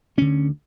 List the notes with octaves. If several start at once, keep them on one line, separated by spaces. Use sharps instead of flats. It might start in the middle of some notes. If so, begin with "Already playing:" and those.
D2 D3 C#4